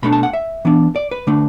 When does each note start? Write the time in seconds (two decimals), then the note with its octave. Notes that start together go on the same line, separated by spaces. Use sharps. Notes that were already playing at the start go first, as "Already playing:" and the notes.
0.03 B2 A3 D4 B5
0.13 A5
0.23 F#5
0.33 E5
0.65 E3 B3 D4
0.96 D5
1.11 B4
1.27 D3 A3 D4